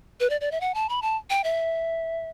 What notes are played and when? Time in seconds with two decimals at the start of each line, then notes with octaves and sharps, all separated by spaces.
0.20 B4
0.30 D5
0.41 D5
0.51 E5
0.61 F#5
0.74 A5
0.89 B5
1.02 A5
1.30 G5
1.44 E5